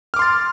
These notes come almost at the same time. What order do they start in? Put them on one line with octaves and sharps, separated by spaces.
F6 D6 C6 A6